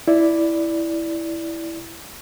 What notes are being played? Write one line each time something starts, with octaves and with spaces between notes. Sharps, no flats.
E4 D5